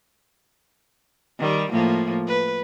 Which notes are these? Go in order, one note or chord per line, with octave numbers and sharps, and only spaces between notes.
D#3 G3
A2 F3 A#3
B4